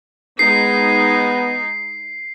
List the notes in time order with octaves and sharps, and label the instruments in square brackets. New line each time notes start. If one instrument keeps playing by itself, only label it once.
[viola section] G#3 D#4 [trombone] B3 [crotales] C7